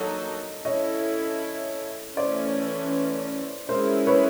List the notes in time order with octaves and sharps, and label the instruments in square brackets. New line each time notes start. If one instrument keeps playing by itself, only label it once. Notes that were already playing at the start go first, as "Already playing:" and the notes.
Already playing: [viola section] F#3 A#3 D#4 F#4 A4 [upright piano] D#5
[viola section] C#4 E4 A4 [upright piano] C#5 D#5
[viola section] E3 A3 C#4 [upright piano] C5 D5
[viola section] G#3 C#4 E4 [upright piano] A#4 C5
[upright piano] B4 C#5